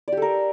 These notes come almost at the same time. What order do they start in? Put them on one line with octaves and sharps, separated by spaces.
D5 G4 A4 A#4